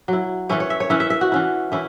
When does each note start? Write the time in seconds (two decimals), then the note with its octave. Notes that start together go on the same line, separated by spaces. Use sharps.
0.08 F#3 E4
0.49 E3 C#4 E4 C#5
0.60 C#5
0.70 E5
0.80 C#5
0.90 E3 C#4 E4 E5
1.00 E5
1.10 E5
1.21 F#4
1.32 E3 C#4 E4
1.72 E3 C#4 E4